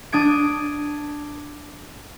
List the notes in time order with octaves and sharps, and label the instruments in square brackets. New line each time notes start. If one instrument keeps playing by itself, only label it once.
[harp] D4 D#6 G#6 D7